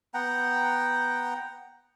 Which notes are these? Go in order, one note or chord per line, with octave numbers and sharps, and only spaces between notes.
B3 F#5 G5 A#5